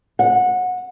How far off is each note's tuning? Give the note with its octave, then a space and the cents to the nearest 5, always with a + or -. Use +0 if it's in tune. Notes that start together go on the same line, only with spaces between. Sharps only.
F#5 -20